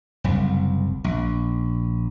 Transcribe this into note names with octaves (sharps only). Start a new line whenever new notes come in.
F#1 C2
A#1